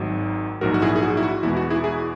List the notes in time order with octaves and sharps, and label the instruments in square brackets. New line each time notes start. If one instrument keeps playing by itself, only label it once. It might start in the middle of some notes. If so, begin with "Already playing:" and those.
Already playing: [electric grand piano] G#1 G#2 F#3
A#1 G#2 F#3 F#4 A#4
F#4
E4 G#4
G#4
F#4
E4
F#4
E2 B2 G#3 E4
F#4
E4 G#4
E4 G#4